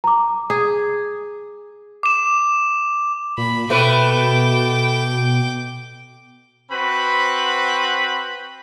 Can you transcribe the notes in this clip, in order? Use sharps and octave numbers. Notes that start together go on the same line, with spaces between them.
A#5 D6
G#4
D6 E7
A#2 B5
B2 A3 B4 G5 D6
C4 F#4 B4 B5